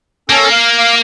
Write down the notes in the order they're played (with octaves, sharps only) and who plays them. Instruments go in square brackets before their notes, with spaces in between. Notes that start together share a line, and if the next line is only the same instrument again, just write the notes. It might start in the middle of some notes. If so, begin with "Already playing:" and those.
[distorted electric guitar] A#3 [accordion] C#4 A4
[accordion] F5 F6
F5 D6